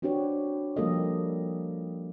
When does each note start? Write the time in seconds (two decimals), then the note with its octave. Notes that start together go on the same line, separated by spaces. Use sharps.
0.02 C4 D4 F#4 G4 B4 C#5
0.76 F3 G3 A#3 G4 A4 D#5